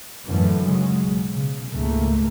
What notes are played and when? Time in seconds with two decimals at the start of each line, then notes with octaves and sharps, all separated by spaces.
0.25 F#2 A2 D3 E3
0.63 C#3 F#3 G#3
1.00 B1
1.34 C#3
1.72 C#2 G#2 A3 A#3